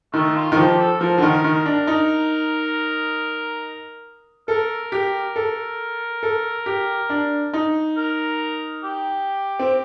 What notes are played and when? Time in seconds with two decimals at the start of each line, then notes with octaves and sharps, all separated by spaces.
0.13 D#3 A3
0.36 F4
0.52 D#3
0.57 F3 G4
0.79 A4
1.00 F3 A#4
1.18 D3
1.22 D#3
1.44 D#3
1.66 D4
1.87 D#4
4.48 A4 A#4
4.92 G4
5.36 A4
6.23 A4
6.66 G4
7.10 D4
7.53 D#4
7.97 A#4
8.84 G4
9.59 C4